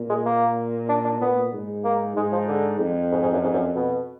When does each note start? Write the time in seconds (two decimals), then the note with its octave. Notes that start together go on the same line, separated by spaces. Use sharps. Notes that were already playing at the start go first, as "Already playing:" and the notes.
Already playing: A#2
0.10 G#3
0.26 A#3
0.89 D4
1.05 D4
1.21 A#2 B3
1.53 G#2
1.84 A#3
2.17 G#2 G#3
2.32 F3
2.48 D3
2.79 F2
3.11 G#2
3.22 G#2
3.33 F#2
3.43 G#2
3.53 F#2
3.75 B2